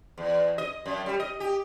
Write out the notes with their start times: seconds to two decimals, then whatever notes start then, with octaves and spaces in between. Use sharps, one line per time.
0.18 E2
0.58 D#5
0.86 F#2
1.06 G3
1.20 D#5
1.40 G4